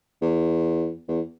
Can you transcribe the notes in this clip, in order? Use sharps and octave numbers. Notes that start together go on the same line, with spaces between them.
E2
E2